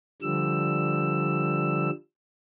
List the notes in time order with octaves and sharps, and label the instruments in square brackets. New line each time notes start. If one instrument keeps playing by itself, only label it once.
[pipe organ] D3 F3 G3 E6